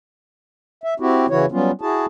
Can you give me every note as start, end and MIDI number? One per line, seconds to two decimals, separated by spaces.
0.84 0.94 76
1.00 1.26 60
1.00 1.26 64
1.00 1.26 66
1.00 1.26 67
1.30 1.46 49
1.30 1.46 52
1.30 1.46 64
1.30 1.46 66
1.30 1.46 73
1.52 1.71 54
1.52 1.71 55
1.52 1.71 59
1.52 1.71 61
1.52 1.71 65
1.81 2.06 64
1.81 2.06 66
1.81 2.06 68
1.81 2.06 81